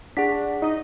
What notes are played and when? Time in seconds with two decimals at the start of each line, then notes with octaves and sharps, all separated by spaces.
0.17 D4 G#4 F#5 B6
0.62 D#4 D#5